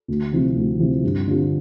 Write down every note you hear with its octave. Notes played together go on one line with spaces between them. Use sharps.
D2
C3 F3 C4 E4
D2
C3 F3 C4 E4
G2
D3 G3 C4 F4